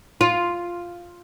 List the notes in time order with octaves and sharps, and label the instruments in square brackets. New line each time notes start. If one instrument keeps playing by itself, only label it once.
[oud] F4